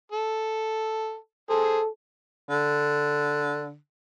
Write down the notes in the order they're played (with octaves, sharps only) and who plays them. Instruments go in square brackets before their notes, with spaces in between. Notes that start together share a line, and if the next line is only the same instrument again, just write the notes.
[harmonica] A4
[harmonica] G#4 C5 [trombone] A4
[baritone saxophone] D3